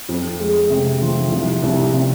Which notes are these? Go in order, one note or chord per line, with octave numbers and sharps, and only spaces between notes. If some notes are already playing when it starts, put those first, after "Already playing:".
F2
G#3
C3
F3
C2
C2
C3